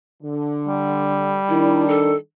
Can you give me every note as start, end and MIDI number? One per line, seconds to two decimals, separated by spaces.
0.23 1.41 50
0.67 2.19 55
1.49 2.14 51
1.49 2.14 62
1.49 1.84 64
1.88 2.16 69